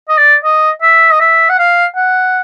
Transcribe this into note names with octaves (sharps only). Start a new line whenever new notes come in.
D#5
D5
D#5
E5
D#5
E5
F#5
F5
F#5